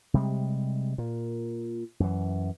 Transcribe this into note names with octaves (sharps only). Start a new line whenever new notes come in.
C3 G3 G#3
A#2
F#2 E3